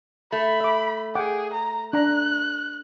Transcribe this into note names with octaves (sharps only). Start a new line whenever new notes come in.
A3 B5
E5 D6
G#4 F#5 G5 D6
A#5
D4 A#5 F#6